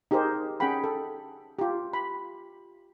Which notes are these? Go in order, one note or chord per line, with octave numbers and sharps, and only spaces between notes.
D#4 G4 G#4 A#4 C5
C#4 G#4 F#5 G5 B5
A4
F4 G4
B5